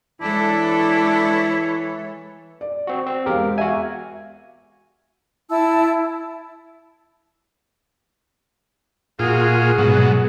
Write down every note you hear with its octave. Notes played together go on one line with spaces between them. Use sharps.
E3 G#3 D4 E4 A4 C#5
D5
C4 F#4
C4
E1 G#3 G4 A#4 F5
F#4 E5 F5 G#5
E4 A5 E6
A#2 F4 F#4 G#4
G#2 B2 F#3